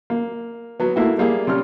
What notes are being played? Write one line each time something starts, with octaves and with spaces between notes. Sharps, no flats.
A#3
F#3 B3
A3 A#3 E4 F#4
G3 A#3 G4 G#4
C3 G3 C#4 F6